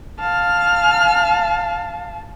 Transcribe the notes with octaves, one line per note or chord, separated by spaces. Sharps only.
F5 A5 F6